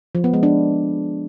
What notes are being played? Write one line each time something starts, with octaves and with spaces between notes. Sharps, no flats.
F3
B3
G#3
D4